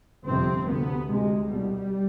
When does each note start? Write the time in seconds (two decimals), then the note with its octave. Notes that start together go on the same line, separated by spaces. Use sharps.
0.26 G1 F2 C3 C4
0.68 D2 C3 B3
1.09 D2 C3 G#3
1.51 C2 B2 G3